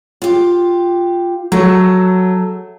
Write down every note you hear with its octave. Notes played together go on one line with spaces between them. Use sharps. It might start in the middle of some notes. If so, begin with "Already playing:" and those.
F4 G4
F#3 A3 A4